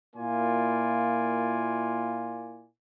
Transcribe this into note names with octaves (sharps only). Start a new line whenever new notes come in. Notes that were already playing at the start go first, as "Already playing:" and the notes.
A#2 A#3 E4 F4 D5 G#5